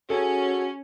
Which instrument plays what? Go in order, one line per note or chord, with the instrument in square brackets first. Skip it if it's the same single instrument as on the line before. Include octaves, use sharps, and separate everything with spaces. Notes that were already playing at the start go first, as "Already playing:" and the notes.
[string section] C#4 [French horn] F#4 [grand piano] G#4 A4